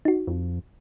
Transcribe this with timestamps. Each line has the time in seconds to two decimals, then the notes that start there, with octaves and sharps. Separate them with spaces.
0.05 D#4 F#4
0.27 F2